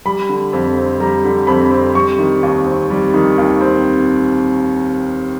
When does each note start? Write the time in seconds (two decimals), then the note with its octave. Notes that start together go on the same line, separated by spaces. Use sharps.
0.05 G3 B5
0.29 D3
0.53 F2
0.77 C4
1.00 G3 A#5
1.24 D3
1.47 F2 B5
1.71 C4
1.95 G3 C#6
2.19 D#3
2.43 D#2
2.66 C4
2.90 G3
3.14 D#3
3.38 D#2
3.61 C4